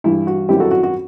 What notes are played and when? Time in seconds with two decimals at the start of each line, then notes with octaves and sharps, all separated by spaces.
0.04 G2 E3 G3 E4
0.27 F#4
0.49 F#2 D#3 G3 C4 E4 G4
0.60 F#4 A4
0.71 F#4
0.83 F#4